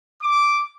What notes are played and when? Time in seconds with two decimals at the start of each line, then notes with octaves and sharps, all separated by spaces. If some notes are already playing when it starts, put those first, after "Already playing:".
0.23 D6